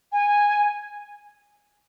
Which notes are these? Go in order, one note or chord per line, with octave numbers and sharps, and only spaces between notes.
G#5